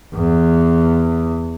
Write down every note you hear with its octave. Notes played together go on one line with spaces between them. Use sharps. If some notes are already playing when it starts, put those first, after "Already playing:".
E2